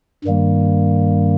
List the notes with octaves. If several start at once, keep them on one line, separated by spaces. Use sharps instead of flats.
G2 D#3 G3 A#3